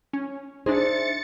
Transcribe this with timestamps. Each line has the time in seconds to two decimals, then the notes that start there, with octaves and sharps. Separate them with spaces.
0.13 C#4
0.66 D4 D#4 G#4 C5 E5 A6 C#7